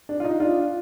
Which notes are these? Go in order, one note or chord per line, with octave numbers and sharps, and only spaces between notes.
D4
F4
D#4
D4 F4